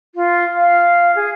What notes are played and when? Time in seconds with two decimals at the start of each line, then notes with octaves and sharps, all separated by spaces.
0.15 F4
0.55 F5
1.15 G#4